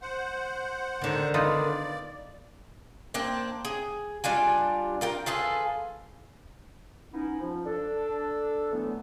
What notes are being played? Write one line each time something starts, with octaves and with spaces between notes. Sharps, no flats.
C5 F#5
D3 D#3
B3 D#4 F4 D5
A#3 C4 D4 G5
G#4
G3 D4 F4 G#5
F4 A#4 G5
F4 G#4 A4 B4
B3 C#4 D#4 E4
F3
D4 A4
D3 E3 F#3 A3 B3